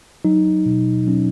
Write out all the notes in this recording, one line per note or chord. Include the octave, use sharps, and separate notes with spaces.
F#3 D#4
B2
F#3 C#4